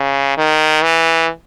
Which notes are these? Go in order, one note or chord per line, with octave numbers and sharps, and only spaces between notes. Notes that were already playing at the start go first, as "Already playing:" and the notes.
Already playing: C#3
D#3
E3